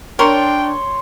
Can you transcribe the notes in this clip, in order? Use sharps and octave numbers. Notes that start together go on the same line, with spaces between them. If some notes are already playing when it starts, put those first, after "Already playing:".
D4 A#4 C#5 G5 C6 C#6